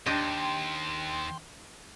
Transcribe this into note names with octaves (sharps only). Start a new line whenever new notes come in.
D#2 D4 G4 D#5 G5 C6